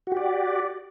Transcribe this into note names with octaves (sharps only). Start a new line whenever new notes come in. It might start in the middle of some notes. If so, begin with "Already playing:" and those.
F#4 G4 D5